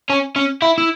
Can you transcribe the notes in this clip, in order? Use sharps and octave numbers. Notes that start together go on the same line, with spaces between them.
C#4
C#4
E4
E4